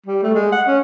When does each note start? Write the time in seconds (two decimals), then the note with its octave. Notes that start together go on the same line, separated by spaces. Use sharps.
0.06 G3
0.23 A3
0.35 G#3
0.52 F#5
0.67 C#4